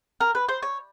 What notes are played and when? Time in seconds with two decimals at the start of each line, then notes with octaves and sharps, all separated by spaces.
0.20 A#4
0.35 B4
0.49 C5
0.63 C#5